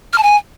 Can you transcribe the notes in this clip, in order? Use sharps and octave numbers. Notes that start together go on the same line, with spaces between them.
F6
A5
G#5